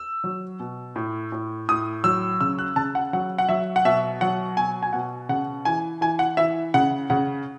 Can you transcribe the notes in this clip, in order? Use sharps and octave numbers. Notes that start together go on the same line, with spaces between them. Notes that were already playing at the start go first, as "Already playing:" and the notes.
Already playing: E6
F#3
B2
A2
A2
A2 D#6
F#3 E6
C#3 E6
F#6
C#3 A5
F#5
F#3 F#5
F#5
F#3 E5
F#5
B2 E5
F#3 F#5
B2 G#5
G#5
B2 F#5
C#3 F#5
E3 G#5
E3 G#5
F#5
E3 E5
C#3 F#5
C#3 F#5